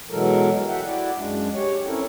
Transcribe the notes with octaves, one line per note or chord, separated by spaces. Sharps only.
B2 E3 F#3 G#3 A4 A#4
F#4 A4 E5 F#5 G5
E4 F#4 D5
F#2 G#3 D4
G4 C#5
C4 C#4 E4 A4 A#4